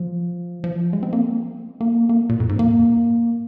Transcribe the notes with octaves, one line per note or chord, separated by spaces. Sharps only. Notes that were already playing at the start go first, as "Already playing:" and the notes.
Already playing: F3
F3
G#3
C4
A#3
A#3
A#3
A#2
F2
G#2
A#3